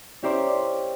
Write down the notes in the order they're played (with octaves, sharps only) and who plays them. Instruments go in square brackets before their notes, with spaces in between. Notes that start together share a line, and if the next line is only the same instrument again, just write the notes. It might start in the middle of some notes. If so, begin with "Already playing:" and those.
[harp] C#4 E4 G4 A#4 C5 D5